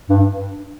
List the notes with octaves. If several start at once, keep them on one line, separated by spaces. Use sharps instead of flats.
G2